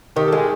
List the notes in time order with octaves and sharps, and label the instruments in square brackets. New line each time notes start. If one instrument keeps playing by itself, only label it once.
[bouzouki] D#3 [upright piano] G4
[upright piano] A4
[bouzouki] G#3 [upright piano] G#4